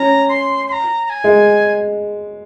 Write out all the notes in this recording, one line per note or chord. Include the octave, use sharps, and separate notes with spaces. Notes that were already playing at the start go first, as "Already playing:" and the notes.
Already playing: C#4 A#5
C6
C6
A#5
A#5
G#5
G#3